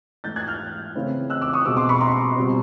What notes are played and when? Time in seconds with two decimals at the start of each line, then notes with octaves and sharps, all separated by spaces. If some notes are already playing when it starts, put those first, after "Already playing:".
0.24 G#2 E3 A3 G6 A6
0.36 F#6 G#6
0.47 F6 G6
0.95 C#3 E3 A3 C4 E4
1.30 E6 F#6
1.41 D6 E6
1.53 C#6 D#6
1.65 B2 G#3 C4 D6 E6
1.77 C6 D6
1.89 B5 C#6
2.00 A#5 C6
2.36 B2 G3 C4